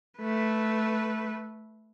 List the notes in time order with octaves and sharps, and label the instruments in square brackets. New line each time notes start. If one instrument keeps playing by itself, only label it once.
[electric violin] A3 B4